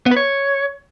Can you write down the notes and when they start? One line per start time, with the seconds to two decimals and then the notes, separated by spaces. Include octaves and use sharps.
0.06 B3
0.11 B4
0.17 C#5